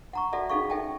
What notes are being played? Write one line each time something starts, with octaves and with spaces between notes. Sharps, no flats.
F#5 A#5 C#6
F#4 A4 D5 E5 F#5 A5
C#4 D#4 G#4 A4 F5 C#6
D#4 A4 E5 G5 A5